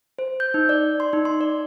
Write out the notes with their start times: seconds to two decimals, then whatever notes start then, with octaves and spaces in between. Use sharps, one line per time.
0.19 C5
0.40 G6
0.54 D#4
0.69 D5
1.00 C6
1.13 D#4
1.25 C6
1.41 D5